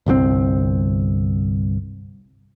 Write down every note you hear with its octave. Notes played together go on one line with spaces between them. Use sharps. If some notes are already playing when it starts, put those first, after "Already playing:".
G1 C2 D3 C4